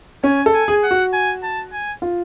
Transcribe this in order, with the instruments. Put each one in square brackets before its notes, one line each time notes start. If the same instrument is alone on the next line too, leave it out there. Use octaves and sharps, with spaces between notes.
[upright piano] C#4 [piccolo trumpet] G#5
[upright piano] A4
[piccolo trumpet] G#5
[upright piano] G#4
[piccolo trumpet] F#5
[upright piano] F#4
[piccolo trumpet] G#5
A5
G#5
[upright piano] F4